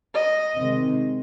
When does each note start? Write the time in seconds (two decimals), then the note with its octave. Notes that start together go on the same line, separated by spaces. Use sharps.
0.14 D#5
0.58 C3 D#3 G#3 C4